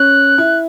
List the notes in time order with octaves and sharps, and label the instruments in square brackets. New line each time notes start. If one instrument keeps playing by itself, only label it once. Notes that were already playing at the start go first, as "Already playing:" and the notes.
Already playing: [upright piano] C#4 [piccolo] F#6
[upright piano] E4